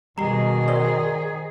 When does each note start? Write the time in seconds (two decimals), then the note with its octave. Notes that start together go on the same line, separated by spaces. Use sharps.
0.18 B2 D#3 G3 G#4 A#5 C7
0.68 A#4 C5 D5 D#6